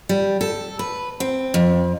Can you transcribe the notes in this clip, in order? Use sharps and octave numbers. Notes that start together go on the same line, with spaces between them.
G3
A4
B4
C4
F2